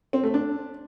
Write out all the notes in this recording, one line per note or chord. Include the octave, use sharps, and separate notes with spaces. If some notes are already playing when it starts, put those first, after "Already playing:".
C4
A3
D4